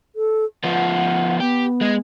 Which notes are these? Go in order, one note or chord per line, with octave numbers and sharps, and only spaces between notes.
A4
F3 B3 F#5
B3 G4
G#3 G#4